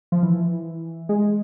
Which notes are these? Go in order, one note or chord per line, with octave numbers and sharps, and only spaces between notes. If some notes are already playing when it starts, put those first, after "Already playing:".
F3
E3
G#3